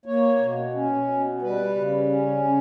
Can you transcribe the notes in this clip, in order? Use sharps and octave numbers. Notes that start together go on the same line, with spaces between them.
A#3 C#5
B2
C#4
B2
G3 B4
C#3
C#4
C#3